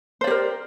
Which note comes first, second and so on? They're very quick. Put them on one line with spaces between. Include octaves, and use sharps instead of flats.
C5 D5 G4 A#4